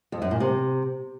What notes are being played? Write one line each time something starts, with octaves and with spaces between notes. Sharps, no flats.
F2
F#2
A#2
C3